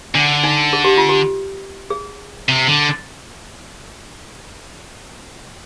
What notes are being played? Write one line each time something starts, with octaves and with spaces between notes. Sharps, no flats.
D3 D4
D#4
G#4
G4
F4
G4
G#4
C3
D3